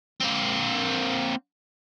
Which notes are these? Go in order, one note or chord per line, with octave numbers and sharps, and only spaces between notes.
A#3 C4